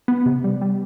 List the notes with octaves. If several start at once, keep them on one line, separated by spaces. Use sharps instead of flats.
B3
C3
G3
G3